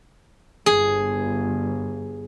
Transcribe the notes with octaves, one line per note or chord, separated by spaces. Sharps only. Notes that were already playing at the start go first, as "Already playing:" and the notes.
G1 G#4